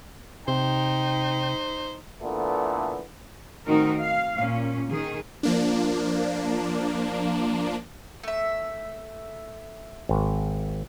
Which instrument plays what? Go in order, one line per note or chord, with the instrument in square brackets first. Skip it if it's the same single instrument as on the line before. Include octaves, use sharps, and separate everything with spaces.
[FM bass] C3 [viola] D#4 [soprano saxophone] C5 [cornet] G5
[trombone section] A#2 D3 E3 A3 B3
[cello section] A2 D#3 C4 D#4 F#4 A#4
F5
A#2 C#4
D#3 G#4
[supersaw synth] F3 A#3 D4
[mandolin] A3 E5
[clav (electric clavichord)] G#1